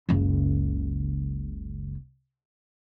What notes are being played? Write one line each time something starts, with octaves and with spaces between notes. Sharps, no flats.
F#1 C#2